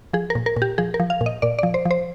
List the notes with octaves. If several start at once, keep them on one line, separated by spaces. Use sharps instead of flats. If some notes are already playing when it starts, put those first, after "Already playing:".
F3 G#4
A#4
A#2
A#4
A#2
G4
F3 G#4
A#4
F3
F5
A#2
D#5
A#2 D5
F3 D5
C5
F3
C5